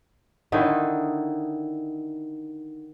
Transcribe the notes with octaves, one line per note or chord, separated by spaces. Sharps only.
D3 D#3 D#4 E4